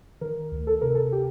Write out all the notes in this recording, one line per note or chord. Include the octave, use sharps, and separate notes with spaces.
D#3 A#4
D2
A4
C3 A#4
A4
G4